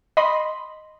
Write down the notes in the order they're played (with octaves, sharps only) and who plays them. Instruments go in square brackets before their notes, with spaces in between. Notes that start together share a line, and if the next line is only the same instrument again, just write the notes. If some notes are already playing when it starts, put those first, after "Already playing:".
[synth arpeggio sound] D#5 B5 C6